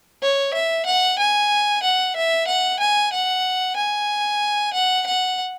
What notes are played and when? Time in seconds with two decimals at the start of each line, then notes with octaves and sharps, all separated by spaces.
0.22 C#5
0.54 E5
0.86 F#5
1.19 G#5
1.83 F#5
2.16 E5
2.47 F#5
2.79 G#5
3.13 F#5
3.76 G#5
4.73 F#5
5.06 F#5